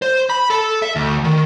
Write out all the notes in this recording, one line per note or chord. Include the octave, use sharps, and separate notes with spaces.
C5
B5
A4
E5
D2
D#3